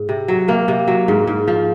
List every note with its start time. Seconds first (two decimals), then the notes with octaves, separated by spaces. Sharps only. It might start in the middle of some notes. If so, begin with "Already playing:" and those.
Already playing: G#2
0.09 C3
0.28 F#3
0.48 C3 A#3
0.68 C3
0.88 F#3
1.08 G#2
1.27 G#2
1.48 F3